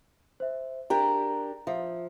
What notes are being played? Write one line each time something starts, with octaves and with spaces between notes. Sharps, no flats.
C5 E5
D4 G4 A#4 A#5
F3 E5